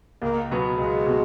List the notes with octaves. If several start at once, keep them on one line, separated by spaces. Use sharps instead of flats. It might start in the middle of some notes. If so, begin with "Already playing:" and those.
C#2 A#3
B2 F#3 B3 F#4
C#2 G#3
B2 F#3 B3 F#4